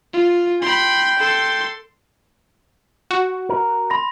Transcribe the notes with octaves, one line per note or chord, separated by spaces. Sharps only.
F4
G5 B5 C6
A4 C6
F#4
A#4
B5 C6 A#6